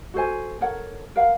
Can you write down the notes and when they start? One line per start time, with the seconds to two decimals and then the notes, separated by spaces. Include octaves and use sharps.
0.14 F#4 A4 C5 G#5
0.61 A4 A#4 C#5 F#5
1.16 A#4 F5 F#5